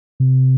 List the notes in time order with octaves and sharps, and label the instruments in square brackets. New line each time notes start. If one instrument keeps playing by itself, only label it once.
[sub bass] C3